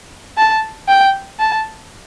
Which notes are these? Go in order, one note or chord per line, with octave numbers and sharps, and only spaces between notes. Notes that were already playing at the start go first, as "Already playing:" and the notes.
A5
G5
A5